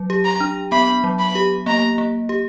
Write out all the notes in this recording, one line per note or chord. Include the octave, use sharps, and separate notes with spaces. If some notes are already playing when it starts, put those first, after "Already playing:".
Already playing: F#3
G4
A#5
D4
B3 B5
F#3
B5
G4
A#3 A#5
A#3
G4